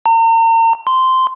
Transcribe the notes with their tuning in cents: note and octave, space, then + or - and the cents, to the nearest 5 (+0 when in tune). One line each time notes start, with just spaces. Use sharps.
A#5 -40
C6 -10